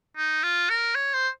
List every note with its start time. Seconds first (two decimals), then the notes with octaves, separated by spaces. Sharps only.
0.17 D#4
0.43 F4
0.70 A#4
0.95 C#5
1.14 C5